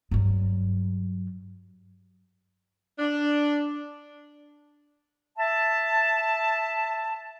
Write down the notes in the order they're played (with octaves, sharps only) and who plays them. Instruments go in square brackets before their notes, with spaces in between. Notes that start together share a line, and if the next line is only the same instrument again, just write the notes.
[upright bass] G2 F#3
[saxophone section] D4
[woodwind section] E5 A5